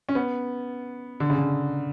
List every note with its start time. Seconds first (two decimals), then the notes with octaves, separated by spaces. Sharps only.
0.09 C#4
0.15 B3
1.20 D3
1.30 C#3
1.38 D3